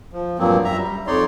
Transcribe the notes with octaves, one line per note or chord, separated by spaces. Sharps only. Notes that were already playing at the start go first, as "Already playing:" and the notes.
F3
G2 A#2 F3 F#3 A#3 C4
F#2 E5 A#5
G3
F2 D#4 C#5 D5 C6